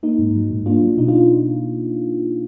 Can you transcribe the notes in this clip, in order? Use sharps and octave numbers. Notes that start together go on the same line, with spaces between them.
A#3 D#4
G#2
F#3
G#2
A#3 D4 F4
F#3
B2 D#4
D4 F4